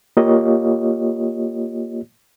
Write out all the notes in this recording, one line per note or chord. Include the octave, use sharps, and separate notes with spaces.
A#3 F4 G4 C#5 D#5